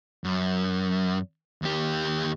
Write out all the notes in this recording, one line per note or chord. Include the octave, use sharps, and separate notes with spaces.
F#2
D#2 G4